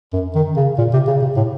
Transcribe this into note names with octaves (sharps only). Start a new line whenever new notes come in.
F#2
D#3
C#3
A#2
C3
C#3
C3
A2